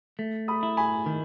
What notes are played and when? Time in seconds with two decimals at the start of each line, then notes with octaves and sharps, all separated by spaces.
0.19 A3
0.48 B5 D#6
0.63 E4
0.77 G#5 B5
1.06 D#3